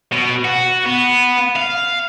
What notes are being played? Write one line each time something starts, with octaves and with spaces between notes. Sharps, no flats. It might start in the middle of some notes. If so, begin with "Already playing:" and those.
B2
F#4
B3
F5